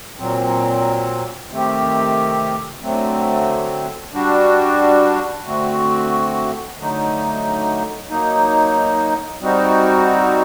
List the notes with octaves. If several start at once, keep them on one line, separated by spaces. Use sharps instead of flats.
A#2 F#3 C4
C3 D#3 A3 C4 G4
D3 F#3 A3 C4
G3 D4 F#4
D3 A3 C4 F#4
D3 F#3 A3 D#4
F#3 A#3 D#4
G3 C4 D#4 F#4